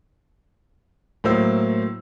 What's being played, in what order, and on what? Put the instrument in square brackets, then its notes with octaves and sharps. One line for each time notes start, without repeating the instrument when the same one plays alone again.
[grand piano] A2 F#3 A#3 C5 E6